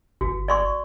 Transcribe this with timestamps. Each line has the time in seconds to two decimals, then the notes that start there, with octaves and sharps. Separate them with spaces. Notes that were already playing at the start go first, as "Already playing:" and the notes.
0.21 G1 F#4
0.48 D5 C6 C#6